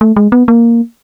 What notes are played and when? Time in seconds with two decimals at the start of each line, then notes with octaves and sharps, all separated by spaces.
0.01 A3
0.16 G#3
0.32 B3
0.48 A#3